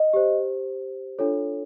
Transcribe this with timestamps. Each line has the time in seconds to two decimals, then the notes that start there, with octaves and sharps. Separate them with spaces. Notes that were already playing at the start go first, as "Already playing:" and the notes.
Already playing: D#5
0.13 G4 C5
1.19 D4 F4 A4 C#5